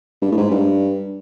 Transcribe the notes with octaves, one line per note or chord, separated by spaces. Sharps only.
G2
A2
G#2
G2